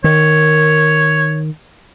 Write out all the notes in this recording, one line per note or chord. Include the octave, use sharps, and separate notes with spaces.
D#3 C#5